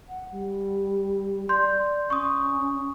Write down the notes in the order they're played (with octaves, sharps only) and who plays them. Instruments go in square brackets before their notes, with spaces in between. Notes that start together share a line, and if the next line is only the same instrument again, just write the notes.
[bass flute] F#5
G3
[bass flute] D5 [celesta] C6 G6
[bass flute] C#4 [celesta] C#6 D#6